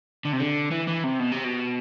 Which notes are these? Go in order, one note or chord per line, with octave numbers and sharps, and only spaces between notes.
D3
C3
D3
E3
E3
C3
B2
C3
B2